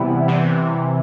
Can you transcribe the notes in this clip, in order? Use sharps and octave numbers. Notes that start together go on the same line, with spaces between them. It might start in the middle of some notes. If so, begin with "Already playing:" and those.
Already playing: C3 E3 G3 B3 E4
C3 E3